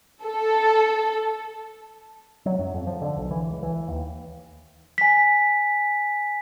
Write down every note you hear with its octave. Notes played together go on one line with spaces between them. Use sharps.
A4
F#3
F#2
F2
F3
D3
B1
E3
C#2
E3
D#2
G#5 B6